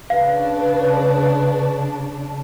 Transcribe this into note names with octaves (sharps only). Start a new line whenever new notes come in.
C#3 D4 B4 F5